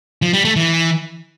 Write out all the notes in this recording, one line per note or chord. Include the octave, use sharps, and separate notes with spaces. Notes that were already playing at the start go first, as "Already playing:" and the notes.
F3
G3
A3
E3